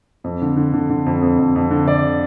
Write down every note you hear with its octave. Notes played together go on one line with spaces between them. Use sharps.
F2
D3
D3
D3
D3
F2
F2
F2
F2
D3
D3 D5